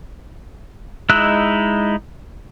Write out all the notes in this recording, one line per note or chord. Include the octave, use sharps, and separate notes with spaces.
G#3 D#4 E4 E6 F#6